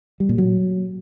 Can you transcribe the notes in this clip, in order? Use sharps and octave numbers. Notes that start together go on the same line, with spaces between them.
G3
A#2
F#3